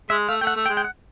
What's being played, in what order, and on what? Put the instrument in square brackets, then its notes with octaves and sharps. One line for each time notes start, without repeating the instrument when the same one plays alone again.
[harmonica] G#3 [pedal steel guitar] E5
[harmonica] A3 [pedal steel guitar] F5
[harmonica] A3 [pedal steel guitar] G5
[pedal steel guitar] F#5
[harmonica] A3
[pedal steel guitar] G5
[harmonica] G#3
[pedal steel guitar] G5
F#5